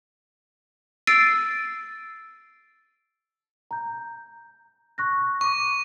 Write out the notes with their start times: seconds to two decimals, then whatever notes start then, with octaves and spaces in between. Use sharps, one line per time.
1.07 E6 A6 C7 D7 D#7
3.71 A#5 G6
4.98 C#6 F#6 A#6
5.41 C#6 D6 D#7